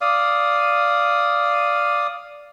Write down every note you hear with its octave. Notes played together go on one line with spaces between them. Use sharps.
D5 F5 D#6